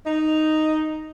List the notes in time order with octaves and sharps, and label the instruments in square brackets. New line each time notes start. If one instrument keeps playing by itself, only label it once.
[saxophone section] D#4